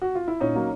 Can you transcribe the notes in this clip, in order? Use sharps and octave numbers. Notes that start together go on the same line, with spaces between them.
F#4
F4
E4
A#2 C#4 D#4
F#3 A#3